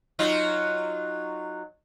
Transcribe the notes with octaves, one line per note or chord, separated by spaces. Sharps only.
F#3 D#4 F4